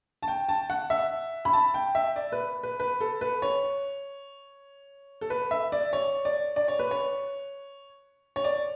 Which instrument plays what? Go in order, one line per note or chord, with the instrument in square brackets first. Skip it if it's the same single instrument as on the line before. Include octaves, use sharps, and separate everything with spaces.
[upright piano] A5
G5
A5
F#5
E5
B5
A5
G5
E5
D5
B4
B4
B4
A4
B4
C#5
A4
B4
E5
D5
C#5
D5
D5
C#5
B4
C#5
C#5
D5